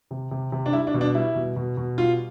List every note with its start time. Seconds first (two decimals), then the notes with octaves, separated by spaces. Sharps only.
0.11 C3
0.31 C3
0.52 C3
0.66 D4
0.73 G3 E4
0.87 D4
0.94 B2
1.01 D4
1.15 G3 E4
1.35 B2
1.56 B2
1.77 B2
1.98 G3 F4